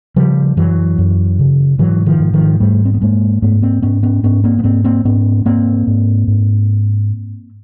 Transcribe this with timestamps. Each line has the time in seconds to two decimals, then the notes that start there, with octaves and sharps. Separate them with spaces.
0.16 C#3 F3 G3
0.57 F#2 E3 F#3
0.98 F#2
1.39 C#3
1.79 G#2 E3 F#3
2.06 D#3 F3
2.19 G#2
2.34 D#3 F3
2.60 G#2 G3 A3
2.85 C4
2.94 B3
3.01 G#2 G#3 A#3
3.42 G#2 A3 B3
3.62 A#3 C4
3.82 G#2 B3 C#4
4.03 B3 C#4
4.23 G#2 B3 C#4
4.44 A#3 C4
4.59 B3
4.64 G#2 A#3 C4
4.84 A#3 C4
5.05 G#2 B3 C#4
5.45 G#2 A#3 C4
5.87 G#2
6.28 G#2